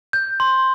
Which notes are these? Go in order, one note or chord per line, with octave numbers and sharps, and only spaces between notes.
G6
C6